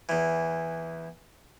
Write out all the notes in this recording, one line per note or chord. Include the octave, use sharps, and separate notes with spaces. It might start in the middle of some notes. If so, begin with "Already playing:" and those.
E2 E3